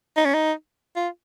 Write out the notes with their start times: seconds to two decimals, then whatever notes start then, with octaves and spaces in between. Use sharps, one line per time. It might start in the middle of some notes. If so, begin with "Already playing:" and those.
0.16 D#4
0.25 C#4
0.34 D#4
0.96 F4